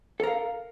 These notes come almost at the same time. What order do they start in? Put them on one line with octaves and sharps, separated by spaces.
A4 A#4 F5